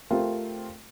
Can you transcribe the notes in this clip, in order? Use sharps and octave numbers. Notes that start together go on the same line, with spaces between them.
A3 C4 F4 G4 A#4